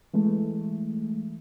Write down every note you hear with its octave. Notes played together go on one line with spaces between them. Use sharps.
E3 G#3 A3